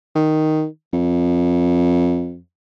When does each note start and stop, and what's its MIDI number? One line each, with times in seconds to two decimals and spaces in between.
0.15 0.65 51
0.93 2.38 41